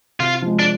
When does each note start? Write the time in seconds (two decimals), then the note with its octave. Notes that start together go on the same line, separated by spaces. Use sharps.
0.20 C3 F4
0.42 F3 G#3
0.59 D4